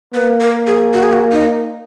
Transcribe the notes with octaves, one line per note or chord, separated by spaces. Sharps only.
A#3 B4
A#4
G#4
F#4
G#4
F#4
D#4